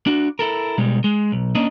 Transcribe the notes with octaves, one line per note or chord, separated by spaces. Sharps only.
D4 F#4
E4 A4 A#4
B2 G3 G#3
G#3
B1
A#3 C#4 D4 D#5